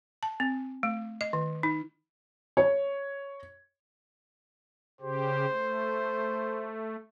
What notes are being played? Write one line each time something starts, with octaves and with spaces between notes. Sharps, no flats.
A5
C4
A3
D#5
D#3
D#4
C#5
C#3 G4 C5
A3